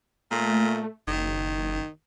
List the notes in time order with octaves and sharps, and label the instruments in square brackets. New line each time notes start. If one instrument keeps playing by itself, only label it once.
[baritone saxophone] A#2 [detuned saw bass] A3
[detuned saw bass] F#1 [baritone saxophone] D#3